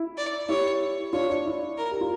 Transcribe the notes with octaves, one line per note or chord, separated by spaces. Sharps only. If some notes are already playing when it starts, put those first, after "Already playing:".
Already playing: E4
D5
E4 G4 C#5
D4 F4 C#5
D4
E4
A#4
G4
F4